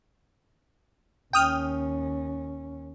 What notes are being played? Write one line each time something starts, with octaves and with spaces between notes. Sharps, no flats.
D#2 C#4 G5 D#6 F6